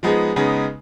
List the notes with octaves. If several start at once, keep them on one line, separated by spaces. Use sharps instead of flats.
F3 G#3 B3 D#4 G#4
C#3 G#3 B3 D#4 G#4